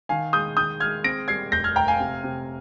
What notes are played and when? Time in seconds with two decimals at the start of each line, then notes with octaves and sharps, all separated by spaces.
0.09 D#3 F5 G#5
0.33 G#3 D#6 G6
0.57 D#3 D#6 G6
0.80 G#3 F6 G#6
1.04 C4 A#6 D7
1.28 G3 G#6 C7
1.52 F1 G6 A#6
1.64 F6 G#6
1.76 F1 G5 A#5
1.88 F5 G#5
2.00 C3
2.23 C3